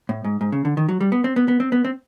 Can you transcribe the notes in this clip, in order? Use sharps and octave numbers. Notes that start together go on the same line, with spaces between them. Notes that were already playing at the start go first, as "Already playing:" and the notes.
A2
G#2
G#2
C#3
D3
D#3
F#3
G3
B3
C4
B3
B3
C4
B3
C4